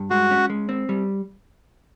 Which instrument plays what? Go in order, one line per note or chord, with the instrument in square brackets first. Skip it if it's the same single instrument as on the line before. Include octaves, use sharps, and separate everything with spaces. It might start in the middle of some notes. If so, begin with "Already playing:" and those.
Already playing: [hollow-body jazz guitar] G2
[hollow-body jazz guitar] G#3 [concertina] F#4
[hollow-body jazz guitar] C#4
G#3
C4
G3